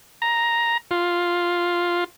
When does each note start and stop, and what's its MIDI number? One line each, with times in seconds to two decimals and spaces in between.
0.22 0.77 82
0.91 2.04 65